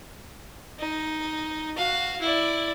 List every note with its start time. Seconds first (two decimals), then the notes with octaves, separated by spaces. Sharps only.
0.79 D#4
1.77 F#4 F5
2.21 E4 D5